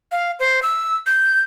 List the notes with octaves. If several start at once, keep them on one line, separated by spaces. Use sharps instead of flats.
F5
C5
E6
G6